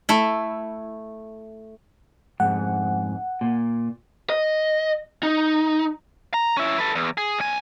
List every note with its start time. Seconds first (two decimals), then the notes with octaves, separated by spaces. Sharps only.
0.09 A3 E4
2.40 F2 G#2 F#5
3.41 A#2
4.30 D#5
5.23 D#4
6.34 A#5
6.57 C#4 E4
6.78 A4 B4
6.95 E2
7.18 G#4
7.39 B1 G#5